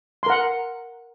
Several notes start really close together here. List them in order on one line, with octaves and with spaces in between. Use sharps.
C6 A#4 F#5